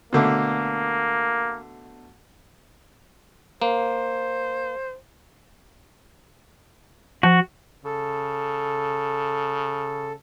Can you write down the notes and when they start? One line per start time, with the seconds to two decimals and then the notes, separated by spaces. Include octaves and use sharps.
0.13 B2 D3 A3 A#3
3.62 A#3 C5
7.23 F3 F#4
7.85 C#3 A4